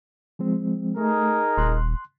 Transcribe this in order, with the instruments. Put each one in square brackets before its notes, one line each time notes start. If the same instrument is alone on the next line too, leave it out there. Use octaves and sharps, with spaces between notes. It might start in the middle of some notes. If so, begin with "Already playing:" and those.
[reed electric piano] F3 G#3 C4
[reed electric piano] A3 [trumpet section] D#4 G#4 A#4
[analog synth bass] D#1 [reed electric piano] C6 F#6